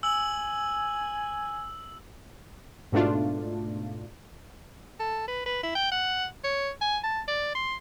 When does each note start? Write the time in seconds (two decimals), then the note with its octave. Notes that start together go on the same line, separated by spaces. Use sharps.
0.03 G#5 E6 F#7
2.92 G#2 B2 A3 D4 F4
5.00 A4
5.28 B4
5.46 B4
5.63 E4
5.75 G5
5.91 F#5
6.44 C#5
6.81 G#5
7.04 A5
7.28 D5
7.55 C6